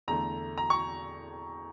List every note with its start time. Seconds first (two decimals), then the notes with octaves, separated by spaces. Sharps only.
0.08 E2 D3 A3 A#5
0.58 A#5
0.70 C#6